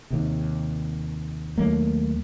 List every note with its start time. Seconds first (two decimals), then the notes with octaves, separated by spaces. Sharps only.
0.10 D#2 C3
1.58 D#2 F#3 A3 A#3